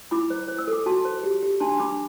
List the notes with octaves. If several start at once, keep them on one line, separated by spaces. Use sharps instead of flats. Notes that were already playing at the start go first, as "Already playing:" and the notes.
E4 B5 D6
C5
C5
E6
A4
D6
F#4 A5 C6
C5
G4
G4
D4 A5 C6
D4 B5 D6